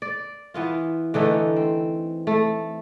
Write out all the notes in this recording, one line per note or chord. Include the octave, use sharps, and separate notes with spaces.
D5
E3 B3 F4
D3 E3 A3 D#4
C4
A3